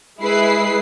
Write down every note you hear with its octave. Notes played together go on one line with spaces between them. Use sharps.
G#3 E4 B4 C7